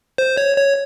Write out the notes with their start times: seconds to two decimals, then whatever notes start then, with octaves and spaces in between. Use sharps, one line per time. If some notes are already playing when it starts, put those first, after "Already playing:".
0.18 C5
0.37 C#5
0.57 C#5